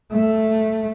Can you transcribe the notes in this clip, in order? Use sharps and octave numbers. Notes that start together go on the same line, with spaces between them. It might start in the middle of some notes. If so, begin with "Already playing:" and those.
A3